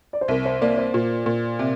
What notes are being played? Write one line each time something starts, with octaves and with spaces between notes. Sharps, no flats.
D5
C5
C2 A#4
C5
A#3 D5
C5
A#2 F4
A#2
C3